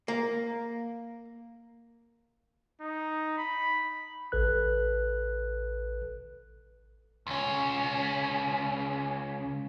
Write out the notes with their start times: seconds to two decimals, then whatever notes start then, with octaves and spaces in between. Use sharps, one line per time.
0.08 A#3
2.81 D#4
3.38 B5
4.32 A1 A4 B4 F#6
7.27 C#2 C#4